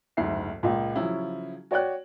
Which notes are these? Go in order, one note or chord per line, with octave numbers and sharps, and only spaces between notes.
F#1 D2 G#2 E5 C7
C#2 A#2
C#3 F3 F#3 C#4 E4
F#4 C#5 D5 G5 F#6